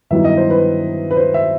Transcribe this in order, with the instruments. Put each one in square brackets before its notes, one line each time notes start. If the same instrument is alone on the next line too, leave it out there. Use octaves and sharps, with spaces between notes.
[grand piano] G2 D#3 F#3 B3 E4 E5
D#5
C5
B4
B4
C5
E5